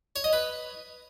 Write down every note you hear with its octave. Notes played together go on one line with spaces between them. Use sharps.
C#5
D#5
B4